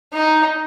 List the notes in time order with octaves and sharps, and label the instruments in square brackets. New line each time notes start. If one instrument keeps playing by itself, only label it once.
[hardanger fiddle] D#4